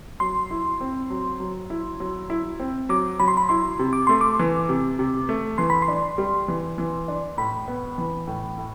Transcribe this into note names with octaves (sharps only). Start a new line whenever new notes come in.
F#3 C6
E4
C4
F#3
F#3
E4
F#3
E4
C4
F#3 D6
F#3 B5
C6
B5
E4 C6
C3
D6
A3 C6
D6
E3
C3
C3
A3
E3 C6
B5
C6
D4
G3
E3
E3
D4
A2 B5
B3
E3
A2
A2